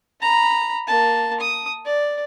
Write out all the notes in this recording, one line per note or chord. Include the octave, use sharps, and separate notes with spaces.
A#5 B5
A#3 A5
D#6
D5